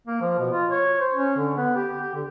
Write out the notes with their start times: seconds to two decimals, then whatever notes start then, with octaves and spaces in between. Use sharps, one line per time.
0.08 A#3
0.21 F3
0.39 B2
0.51 F4
0.70 C#5
1.00 C5
1.14 C#4
1.37 D3
1.57 B3
1.76 G4
1.97 G4
2.14 D3